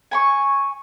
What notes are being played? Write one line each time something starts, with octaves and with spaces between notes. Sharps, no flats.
G#5 B5 C#6